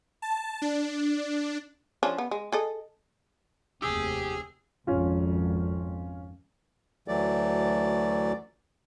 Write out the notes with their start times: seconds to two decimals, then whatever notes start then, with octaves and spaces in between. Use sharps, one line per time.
0.22 A5
0.62 D4
2.03 F3 C#4 D4
2.18 B3
2.31 G#3
2.52 G#4 A4 D#5
3.82 F1 D#2 C3 G4 G#4 D#6 E6
4.87 G#1 F2 G#2 C#4 F4
7.08 D2 E3 F#3 A3 D5